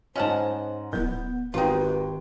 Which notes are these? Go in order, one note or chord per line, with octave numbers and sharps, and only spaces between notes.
G#2 C#4 C5 D#5 F#5 A5
D1 B3 G6
G#1 D#4 F4 G4 B4 G5